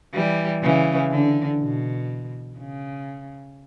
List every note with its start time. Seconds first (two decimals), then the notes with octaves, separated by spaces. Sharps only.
0.14 E3 G3
0.62 C#3 E3
1.11 D3
1.60 B2
2.59 C#3